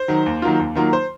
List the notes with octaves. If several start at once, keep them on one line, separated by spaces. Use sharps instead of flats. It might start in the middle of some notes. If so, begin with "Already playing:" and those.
Already playing: C5
D#3 F#3
D#2
D#3 F#3 A#3 F4
D#2
D#3 F#3 A#3 F4
C5